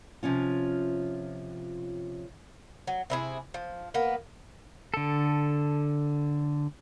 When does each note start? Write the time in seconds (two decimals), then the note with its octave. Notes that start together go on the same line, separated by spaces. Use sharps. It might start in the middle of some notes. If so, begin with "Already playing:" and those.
0.23 C3 F3 C#4 F4
2.87 F#3
3.10 C3 E4 G#4
3.54 F3
3.94 A#3 B3 B4
4.94 D3 A4